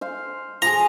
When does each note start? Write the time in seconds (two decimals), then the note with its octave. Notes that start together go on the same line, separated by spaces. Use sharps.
0.01 C5 F5
0.62 F3 G#4 A#5